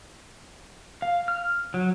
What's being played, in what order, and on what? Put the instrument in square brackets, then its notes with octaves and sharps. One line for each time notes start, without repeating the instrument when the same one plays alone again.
[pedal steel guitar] F5
F6
F#3